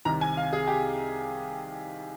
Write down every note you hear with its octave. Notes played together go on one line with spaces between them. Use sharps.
C2 C3 D#3 A#5
G#5
F5
G#4
G4